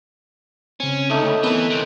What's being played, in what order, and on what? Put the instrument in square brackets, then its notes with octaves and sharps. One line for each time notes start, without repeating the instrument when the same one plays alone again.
[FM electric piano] C#3 C4 [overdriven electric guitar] C#4
[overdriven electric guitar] D2 [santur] A3 D#4
[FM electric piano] A3 [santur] C#5 B5
[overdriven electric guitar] E3 [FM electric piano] B3 C4 A#4 [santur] B4
[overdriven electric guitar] C2 C3